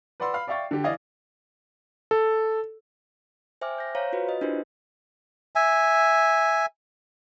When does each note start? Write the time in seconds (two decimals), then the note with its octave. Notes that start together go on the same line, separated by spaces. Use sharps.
0.20 B4 D5 F#5 B5 C6 E6
0.34 F5 B5 F6 C7
0.47 D5 E5 F5 G5 C#6 A6
0.71 D3 G4
0.84 E3 E4 D5 D#5 F5 G#6
2.11 A4
3.61 C5 E5 G5 G#5 D6 F6
3.78 G6 A#6
3.95 C5 C#5 F5 A#5
4.13 F4 F#4 B4
4.29 B4 D#5
4.41 D4 E4 F4 G4 A#4 C5
5.56 E5 G#5